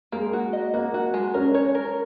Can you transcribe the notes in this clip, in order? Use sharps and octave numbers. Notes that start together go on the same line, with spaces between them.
G#3 A#3
F#4
D#5
A#3 F#4
F#4
G#3
C#4 A#4
C#5
A#4